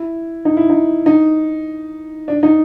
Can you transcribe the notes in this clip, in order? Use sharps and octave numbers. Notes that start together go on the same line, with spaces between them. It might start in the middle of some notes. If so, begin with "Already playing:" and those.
Already playing: E4
D#4
E4
D#4
D#4
D4
D#4